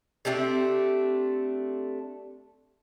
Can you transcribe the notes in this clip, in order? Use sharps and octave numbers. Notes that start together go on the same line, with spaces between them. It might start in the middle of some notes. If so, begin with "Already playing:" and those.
A3 C4 D4 G4